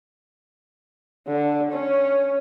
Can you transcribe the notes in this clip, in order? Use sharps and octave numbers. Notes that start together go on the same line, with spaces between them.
D3
C#4